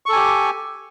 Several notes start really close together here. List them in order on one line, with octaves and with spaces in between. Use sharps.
C#6 A4 G#5 G4